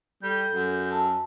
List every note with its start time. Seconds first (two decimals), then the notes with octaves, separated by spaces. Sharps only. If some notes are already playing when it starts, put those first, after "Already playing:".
0.23 G3 A4 G6
0.52 F#2
0.91 A5 E6